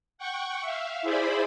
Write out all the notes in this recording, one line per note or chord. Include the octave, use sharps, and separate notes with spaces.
F#5 G5 C#6
E5 F5
E4 G#4 C5 D5 B5